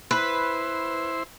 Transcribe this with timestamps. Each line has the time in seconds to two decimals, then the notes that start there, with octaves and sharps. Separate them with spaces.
0.11 E4 B4 C5